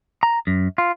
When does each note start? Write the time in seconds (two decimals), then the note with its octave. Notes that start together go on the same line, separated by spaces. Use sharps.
0.23 A#5
0.47 F#2
0.78 F4